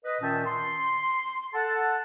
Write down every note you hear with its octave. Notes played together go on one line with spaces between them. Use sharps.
B4 D#5
A#2 D#3 C#4 E5 G5 A5
C6
A4 F#5 A5